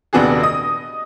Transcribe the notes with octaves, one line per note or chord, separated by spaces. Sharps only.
D#1 C3 B3 D4 F#4 G#4
D#5 D#6